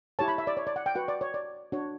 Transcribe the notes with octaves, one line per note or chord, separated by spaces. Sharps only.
E4 G4 C#5 A5
B5
E5
D5
C#5
D5
F#5
G5
F#4 B4 F#5
D5
C#5
D5
D4 F#4 C#5